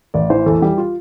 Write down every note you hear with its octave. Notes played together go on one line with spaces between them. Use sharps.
A1 D5
E3 C5
E2 A4
G3 G4
F4